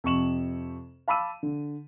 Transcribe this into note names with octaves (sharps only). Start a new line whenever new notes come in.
F2 C3 C#6 E7 F#7
F5 A5 B5 D6 E6 D#7
D3